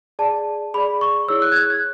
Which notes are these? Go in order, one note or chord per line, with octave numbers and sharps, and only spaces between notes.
G#4 D5 A5
G#4 D5 B5
C#6
E4 G#4 C#5 E6
F#6
G#6
F#6
G#6